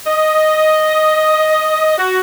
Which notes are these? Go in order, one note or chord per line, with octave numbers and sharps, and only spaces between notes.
D#5
F#4